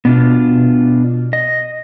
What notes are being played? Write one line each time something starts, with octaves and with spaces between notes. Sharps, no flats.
B2 B3 D4 F4
D#5